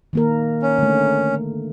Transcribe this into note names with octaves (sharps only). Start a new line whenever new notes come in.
D#3 A#3 A#4
C#4
D3 A3